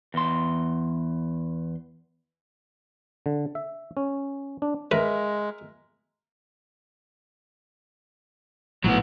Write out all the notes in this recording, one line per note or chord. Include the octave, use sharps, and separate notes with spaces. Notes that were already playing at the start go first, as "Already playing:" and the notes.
E2 C6
D3
E5
C#4
D4
G#3 A#4 B4 E5
A#1 A2 F#3 B3